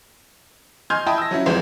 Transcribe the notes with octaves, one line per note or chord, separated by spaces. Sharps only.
D#5 G#5 C6 F6 G6 G#6
E4 D#5 G5 A5 B5 D#6
E6 A#6
F#3 C#4 E4
F1 F2 E3 G#3 C4 C5